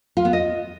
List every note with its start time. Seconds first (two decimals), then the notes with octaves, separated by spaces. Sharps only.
0.17 F4
0.25 B3
0.33 D#5